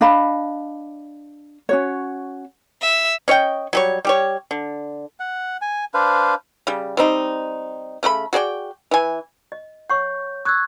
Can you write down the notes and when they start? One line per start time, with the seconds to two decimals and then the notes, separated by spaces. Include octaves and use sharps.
0.01 D4 D#5 F5 B5
1.69 C#4 F#4 C#5
2.82 E5
3.28 C#4 C#5 D#5 G5
3.73 F#3 G3 C#5
4.05 G3 G4 C#5
4.51 D3
5.20 F#5
5.62 G#5
5.94 D4 B4 C5 F5
6.67 C#3 G3
6.97 G3 C4 D#4
8.03 C#3 A3 F#4 B5
8.33 F#4 G#4 D5 G5
8.91 E3 G#5
9.52 D#5
9.90 C#5 F#5 C#6 G6
10.45 C#6 D#6 E6 F#6 G#6